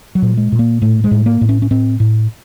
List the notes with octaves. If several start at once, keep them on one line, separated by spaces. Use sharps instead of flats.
F#3
A#2
G#3
A#2
A#3
A2 A3
G#3
A2
A#3
A2
C#4
C#4
A2 C4
A2